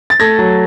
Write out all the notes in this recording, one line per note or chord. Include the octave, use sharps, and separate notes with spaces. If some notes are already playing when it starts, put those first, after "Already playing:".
A6
A3 G#6 A#6
F#3